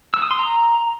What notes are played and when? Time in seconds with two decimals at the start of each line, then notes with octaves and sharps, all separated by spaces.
0.14 E6
0.22 D#6
0.31 C6
0.39 A#5